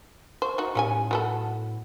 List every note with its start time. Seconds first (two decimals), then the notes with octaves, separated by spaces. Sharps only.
0.42 C5 C#6
0.58 D#4 F#4
0.75 A2 G3 C#4 G#5
1.11 F#3 B3 A4